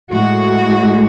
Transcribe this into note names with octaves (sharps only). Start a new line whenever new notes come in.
A2 G#3 F#4